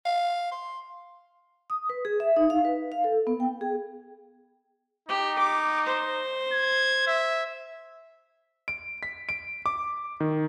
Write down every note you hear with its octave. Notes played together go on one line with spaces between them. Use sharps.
F5
C6
D#6
B4
G#4
E5
D#4
F5
B4
F5
A4
B3
G5
G#4
D#4 G4
D6
C5
G#6
E5
D7
B6
D7
D6
D#3